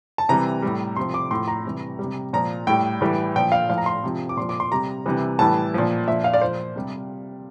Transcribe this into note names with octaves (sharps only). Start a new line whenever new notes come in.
A5
C3 E3 G3 A#5
A2 G3
C3 F3 C6
D6
A2 F3 C6
A#5
C3 E3 G3
G3
C3
A#2 F3 A#5
A2 G3 G5
A2 E3 G3
A#2 F3 G5
F5
A2 F3 F5
A#5
C6
C3 F3
D6
A#2 F3 C6
D6
C6
C3 G3 A#5
C3 E3 G3
A2 E3 G3 A5
A#2 F3
A#2 F3 E5
F5
D5
A#2 F3 C5
C3 G3